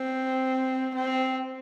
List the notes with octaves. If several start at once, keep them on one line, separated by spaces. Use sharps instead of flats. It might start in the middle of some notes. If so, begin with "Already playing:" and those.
Already playing: C4
C4